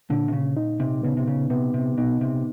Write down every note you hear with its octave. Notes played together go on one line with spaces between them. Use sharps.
A#2 D3
C3
C#3
D#4
C3
C#3 B3
C3
C#3
C3 B3
C3
B2 D#4
C3